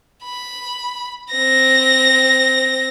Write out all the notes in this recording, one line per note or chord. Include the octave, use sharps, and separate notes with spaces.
B5
C4 A#6